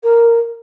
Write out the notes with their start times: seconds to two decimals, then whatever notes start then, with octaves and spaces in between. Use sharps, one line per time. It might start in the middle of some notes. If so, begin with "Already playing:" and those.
0.03 A#4